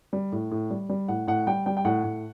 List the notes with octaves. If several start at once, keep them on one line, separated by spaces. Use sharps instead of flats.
G3
A2
A2
G3
G3
A2 F#5
A2 F#5
G3 G5
G3 G5
G5
A2 F#5
A2